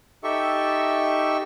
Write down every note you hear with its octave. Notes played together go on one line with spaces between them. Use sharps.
D#4 G4 A4 E5 C#6